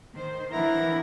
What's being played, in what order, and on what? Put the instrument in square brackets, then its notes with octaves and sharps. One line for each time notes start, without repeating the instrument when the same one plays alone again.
[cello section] D#3 C5
[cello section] E3 D4 A#4 [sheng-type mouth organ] B3 E4 A#5